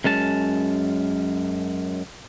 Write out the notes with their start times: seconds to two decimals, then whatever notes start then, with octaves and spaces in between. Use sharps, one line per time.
0.04 F#2 G#3 C#4 A5